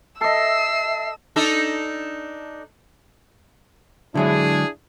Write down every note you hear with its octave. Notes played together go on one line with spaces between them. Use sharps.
A4 D#5 E5 E6 C7
D4 D#4 A4
D3 F#3 G#3 D4 E4 G#4